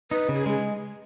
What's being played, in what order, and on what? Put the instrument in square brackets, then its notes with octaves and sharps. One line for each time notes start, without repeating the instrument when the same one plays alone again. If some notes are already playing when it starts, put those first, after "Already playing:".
[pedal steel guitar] D#4 [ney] B4
[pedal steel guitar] C#3
[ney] G#4
[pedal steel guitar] G#3 [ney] G#4